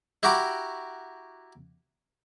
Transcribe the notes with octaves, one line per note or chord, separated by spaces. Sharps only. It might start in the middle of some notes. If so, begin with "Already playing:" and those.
E4 F#4 G4 A#5 B5 D6